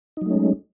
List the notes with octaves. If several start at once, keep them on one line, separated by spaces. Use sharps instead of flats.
F#3 G#3 A3 C#4 D#4